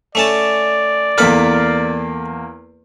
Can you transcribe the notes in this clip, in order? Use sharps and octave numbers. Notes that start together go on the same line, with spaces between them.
A3 C#4 D5 A5
E2 A#3 A4 B4 B5 F6